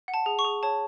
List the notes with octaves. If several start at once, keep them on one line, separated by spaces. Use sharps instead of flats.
F#5
A5
G#4
C#6
G#4
C#5 A5